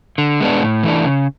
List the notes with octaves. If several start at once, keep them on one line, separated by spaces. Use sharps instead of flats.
D3
G#3 B3 D4
A2
E3 A3 D4
C#3